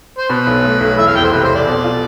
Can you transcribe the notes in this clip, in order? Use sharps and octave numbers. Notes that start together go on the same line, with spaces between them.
C5
B2 B4
B1
A3
B1
E2 E5
F5
F1 G5
C5
C3 B4
C5
F1
D5
B2
F4